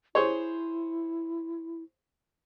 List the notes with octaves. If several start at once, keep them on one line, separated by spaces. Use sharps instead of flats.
E4 G#4 C5 C#5